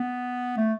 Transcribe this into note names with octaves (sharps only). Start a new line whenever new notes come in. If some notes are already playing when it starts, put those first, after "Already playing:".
Already playing: B3
A3